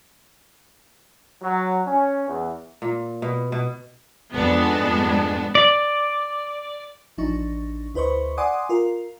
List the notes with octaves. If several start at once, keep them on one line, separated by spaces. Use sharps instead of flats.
F#3
C#4
E2
A#2
B2
B2
F2 G#2 G#3 B3 D4
D5
A1 F3 D4 D#4 C#6
D2 E4 B4 C5 D#5 C#6
D5 F#5 G#5 C6 D6 D#6
F4 A#4